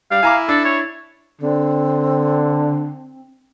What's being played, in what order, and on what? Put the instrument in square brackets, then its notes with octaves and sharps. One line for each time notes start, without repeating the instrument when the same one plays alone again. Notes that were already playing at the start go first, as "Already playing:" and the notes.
[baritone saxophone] G3 [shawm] F5
[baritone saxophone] E4 [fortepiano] G#5 A#5 D6
[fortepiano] D4 [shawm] A4
[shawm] C#5
[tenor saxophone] D3 [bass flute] C4